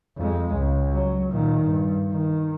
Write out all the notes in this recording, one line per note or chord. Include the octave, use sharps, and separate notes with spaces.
F2 G#3
C#2
F#3
A#2 D#3
G2
D#3